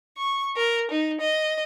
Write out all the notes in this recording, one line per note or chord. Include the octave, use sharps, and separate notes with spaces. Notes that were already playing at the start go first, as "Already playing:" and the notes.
C#6
A#4
D#4
D#5